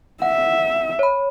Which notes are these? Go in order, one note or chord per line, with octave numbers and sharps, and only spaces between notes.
E5 F#5
C#5 B5